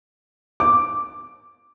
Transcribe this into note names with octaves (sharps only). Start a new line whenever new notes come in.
D6